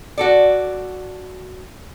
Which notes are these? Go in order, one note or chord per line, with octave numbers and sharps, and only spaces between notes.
F#4 A4 D5